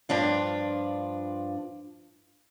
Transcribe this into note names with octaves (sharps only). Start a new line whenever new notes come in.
G2 F3 D4 F4